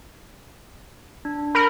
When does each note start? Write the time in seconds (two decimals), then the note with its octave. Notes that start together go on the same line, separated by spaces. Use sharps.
1.25 D4
1.55 A#4 B5 F6